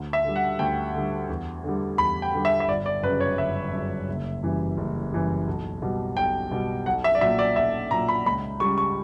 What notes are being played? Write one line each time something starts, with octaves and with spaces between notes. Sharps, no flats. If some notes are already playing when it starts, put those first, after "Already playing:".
Already playing: D2
E5
D3 G3
F#5
D2 G5
D3 G3
E2
D3
G3
E2 B5
G5
D3 G3
E5
E5
G1 D5
D5
F#2 C#3 B4
C#5
G1 E5
F#2 C#3
F#1
F#2 E3 G3
F#1
F#2 E3 G3
B1
B2 G3
B1 G5
B2 G3
B1 F#5
E5
D5
A#2 F#3 E5
D5
B1 E5
A#2 F#3 A#5
B5
C#2 B5
C#3 G3 C#6
C#6